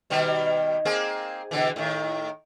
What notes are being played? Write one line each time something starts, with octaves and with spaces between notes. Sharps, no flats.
B2 D#3 G3
A#3 C4 G#4
B2 D3 E3
A2 D#3